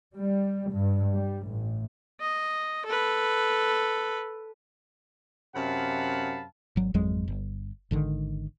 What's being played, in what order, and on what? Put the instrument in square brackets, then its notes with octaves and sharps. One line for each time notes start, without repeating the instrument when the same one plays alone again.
[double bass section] G3
G2
G3
A1
[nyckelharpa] D#5
A4 B4
[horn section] F#2 C3 F5 F#5 A5 B5
[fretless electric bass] G#1 F#3
G#1 F2 F#3 G#3
G1
G#1 D3 D#3